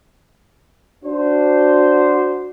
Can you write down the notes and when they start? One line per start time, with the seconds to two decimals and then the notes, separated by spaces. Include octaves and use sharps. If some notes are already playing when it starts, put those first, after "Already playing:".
1.04 D4 F#4 C5